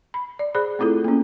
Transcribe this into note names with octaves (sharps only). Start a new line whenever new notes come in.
B5
D5
G#4 C5 D5 B5
A3 C4 E4 F4 A4
A#3 C#4